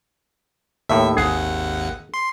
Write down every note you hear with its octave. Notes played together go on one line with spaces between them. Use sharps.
D#2 A2 E5
G#1 D#2 G#4 F#5
C6